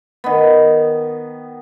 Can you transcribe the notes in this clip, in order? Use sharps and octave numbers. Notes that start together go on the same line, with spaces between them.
D#3 B3